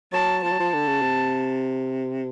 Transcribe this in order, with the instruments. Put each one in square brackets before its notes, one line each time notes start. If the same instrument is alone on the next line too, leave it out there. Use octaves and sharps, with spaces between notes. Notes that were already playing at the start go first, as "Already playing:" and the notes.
[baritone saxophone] F#3 [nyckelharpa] A5
[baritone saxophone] F3 [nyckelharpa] A5
[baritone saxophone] F#3
F3
D3
C#3
C3